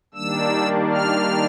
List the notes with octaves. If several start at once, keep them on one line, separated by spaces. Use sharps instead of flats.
D#3 G3 A#3 D4 E6
F6